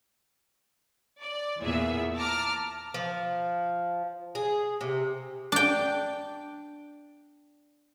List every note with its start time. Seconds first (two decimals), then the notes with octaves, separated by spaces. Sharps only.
1.21 D5
1.59 E2 A#2 B3 G#4 E5
2.15 A5 A#5 D6 F6
2.94 F3
4.35 G#4
4.81 C3
5.52 D4 G5